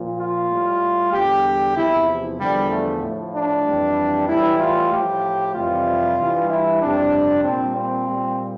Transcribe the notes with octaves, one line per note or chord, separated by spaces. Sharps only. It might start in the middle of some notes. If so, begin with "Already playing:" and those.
Already playing: A#2 F3
F4
A2 G3
E2 D3 G3 G4
E2 C3 F3 E4
E2 D3 F3 G3
A3
A2 F3
D4
F2 E3 G3
A2 E3 G3 E4
F4
A2 F3 G4
F2 C3 E3 G3 F4
G2 E3 G3
E4
F2 C3 G3 D4
A#2 G3 C4
C4
A#2 G3